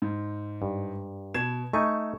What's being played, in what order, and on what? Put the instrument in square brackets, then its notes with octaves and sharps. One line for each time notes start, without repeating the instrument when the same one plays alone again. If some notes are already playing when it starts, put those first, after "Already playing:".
[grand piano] G#2
[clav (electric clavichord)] G2
[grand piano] B2 G#6 E7
[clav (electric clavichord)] A3 D#4 G#5 [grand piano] C#6